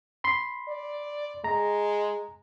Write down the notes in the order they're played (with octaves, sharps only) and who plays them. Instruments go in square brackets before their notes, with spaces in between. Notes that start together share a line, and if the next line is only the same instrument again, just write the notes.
[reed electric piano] B5 C6
[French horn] D5
[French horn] G#3 [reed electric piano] A#5